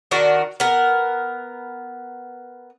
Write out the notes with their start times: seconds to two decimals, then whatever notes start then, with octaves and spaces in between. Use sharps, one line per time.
0.11 D#3 D4 F#4 A#4
0.60 B3 A#4